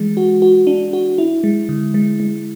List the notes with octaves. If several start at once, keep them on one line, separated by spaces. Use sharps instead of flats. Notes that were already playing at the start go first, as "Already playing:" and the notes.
Already playing: E3 G#3
F#4
F#4
D4
F#4
E4
G#3
D3
G#3
G#3